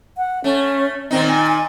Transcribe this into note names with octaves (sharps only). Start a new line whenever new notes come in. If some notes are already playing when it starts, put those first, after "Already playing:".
F#5
A3 C#4
A#2 D#3 C4 D#4
G#5
G#5